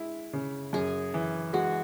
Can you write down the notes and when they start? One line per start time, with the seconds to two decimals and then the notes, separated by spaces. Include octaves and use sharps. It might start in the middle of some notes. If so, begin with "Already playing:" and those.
Already playing: G#3 E4
0.33 C#3
0.73 F#2 G#4
1.14 E3
1.53 G#3 F#4